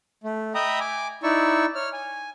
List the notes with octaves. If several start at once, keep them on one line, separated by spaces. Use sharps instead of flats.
A3
D#5 E5 G5 A#5 B5 D#6
G#5 D6
D#4 E4 D5 C#6 E6
C#5 F6
G#5